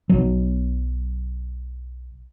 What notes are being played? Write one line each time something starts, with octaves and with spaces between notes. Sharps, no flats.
B1 F#3